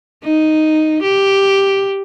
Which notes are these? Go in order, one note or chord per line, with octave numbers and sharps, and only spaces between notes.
D#4
G4